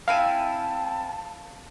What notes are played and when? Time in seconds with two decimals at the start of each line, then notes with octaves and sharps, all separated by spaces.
0.08 C4 E4 F5 G#5 A5